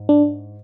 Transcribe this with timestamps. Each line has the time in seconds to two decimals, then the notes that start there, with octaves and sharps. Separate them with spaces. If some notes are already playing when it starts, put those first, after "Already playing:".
Already playing: G#2
0.09 D4